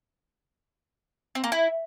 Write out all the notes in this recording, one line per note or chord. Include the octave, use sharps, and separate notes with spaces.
C4
A#3
E4